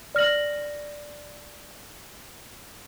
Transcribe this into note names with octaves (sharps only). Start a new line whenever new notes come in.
D5 F6 A#6 F#7